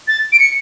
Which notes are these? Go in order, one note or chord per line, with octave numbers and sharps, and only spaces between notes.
A6
D7
C#7